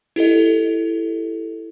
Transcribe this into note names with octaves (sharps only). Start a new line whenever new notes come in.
E4 G4 A4 D#5